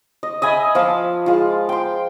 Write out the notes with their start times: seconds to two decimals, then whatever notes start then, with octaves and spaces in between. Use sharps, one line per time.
0.23 D#5
0.42 D#5 E5 G#5 B5
0.75 F3 F4 A5 D6
1.26 G#3 F4
1.69 G5 C6